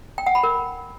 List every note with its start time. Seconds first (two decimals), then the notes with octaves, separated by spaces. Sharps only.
0.18 G5
0.26 F#5
0.35 B5
0.43 A#4